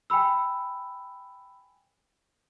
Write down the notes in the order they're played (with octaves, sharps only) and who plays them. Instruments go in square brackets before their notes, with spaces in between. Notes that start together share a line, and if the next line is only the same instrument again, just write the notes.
[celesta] G5 G#5 B5 E6